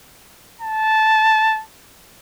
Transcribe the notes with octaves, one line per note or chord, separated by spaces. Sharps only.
A5